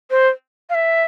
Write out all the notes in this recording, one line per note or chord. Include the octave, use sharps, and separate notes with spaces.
C5
F5
E5